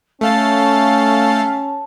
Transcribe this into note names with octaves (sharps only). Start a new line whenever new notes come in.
A3 C#4 F5 A5 A6